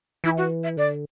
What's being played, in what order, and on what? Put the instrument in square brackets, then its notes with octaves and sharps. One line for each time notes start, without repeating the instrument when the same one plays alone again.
[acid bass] E3 [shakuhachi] E4
[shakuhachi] F#4
E5
[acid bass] D3 [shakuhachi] D5